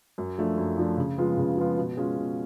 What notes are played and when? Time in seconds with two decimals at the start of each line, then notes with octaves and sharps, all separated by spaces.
0.18 F#2
0.38 F3 A3 D4
0.57 F#2
0.77 F3 A3 D4
0.97 C#3
1.18 F3 G#3 B3 F4
1.38 C#3
1.57 F3 G#3 B3 F4
1.77 B2
1.97 G#3 C#4 F4
2.17 B2